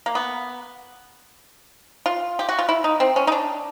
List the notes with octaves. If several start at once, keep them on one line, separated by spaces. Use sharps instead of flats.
A#3
B3
F4
G4
F#4
F4
E4
D#4
C4
C#4
D#4
D4